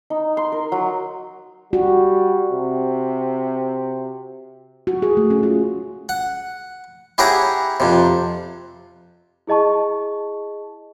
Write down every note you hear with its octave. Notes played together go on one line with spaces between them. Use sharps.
D#4
C6
A#4
F#3
G3 F#4
C3
F#4
G#4
A3
C#4
F4
F#5
E4 G4 G#4 C#5 F#5 A#5
F2 C3
E4 G#4 D#5 A5 C#6